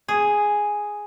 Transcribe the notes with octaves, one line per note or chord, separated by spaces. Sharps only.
G#4